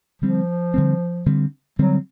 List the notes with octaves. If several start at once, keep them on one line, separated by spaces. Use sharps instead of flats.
D3 F3 G3 C4
D3 G3 C4
D3 G3 C4
D3 F#3 G3 C4